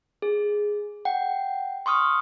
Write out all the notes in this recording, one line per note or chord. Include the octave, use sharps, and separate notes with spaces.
G#4
F#5 G5
C6 C#6 D#6 F6